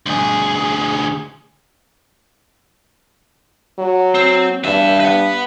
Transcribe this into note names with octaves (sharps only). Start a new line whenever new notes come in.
D2 G#4
F#3
C4
G2 B3 E5
B4 F#5